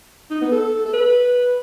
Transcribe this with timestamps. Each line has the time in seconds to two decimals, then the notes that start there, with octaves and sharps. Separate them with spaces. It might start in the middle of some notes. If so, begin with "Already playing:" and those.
0.30 D#4
0.41 B3
0.51 A4
0.85 A4
0.93 B4